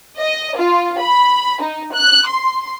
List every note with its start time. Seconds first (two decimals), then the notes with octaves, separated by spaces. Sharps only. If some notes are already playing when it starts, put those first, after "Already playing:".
0.18 D#5
0.56 F4
1.00 B5
1.62 D#4
1.94 F#6
2.27 C6